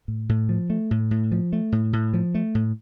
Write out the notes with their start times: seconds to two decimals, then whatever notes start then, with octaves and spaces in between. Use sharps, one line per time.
0.08 A2
0.29 A2
0.49 F3
0.70 A3
0.91 A2
1.11 A2
1.32 F3
1.53 A3
1.72 A2
1.93 A2
2.13 F3
2.35 A3
2.55 A2